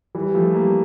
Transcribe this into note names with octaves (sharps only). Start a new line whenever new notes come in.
E3 G3
G3
F3 A3
G3 A#3